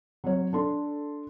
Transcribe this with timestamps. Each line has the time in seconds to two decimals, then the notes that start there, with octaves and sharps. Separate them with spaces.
0.24 F#3 C4 C#5
0.53 D4 A4 C6